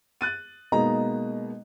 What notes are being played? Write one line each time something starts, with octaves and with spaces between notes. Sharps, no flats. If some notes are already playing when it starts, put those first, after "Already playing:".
F#6 A6 D#7
B2 G#3 A#3 B3 D#4 A#5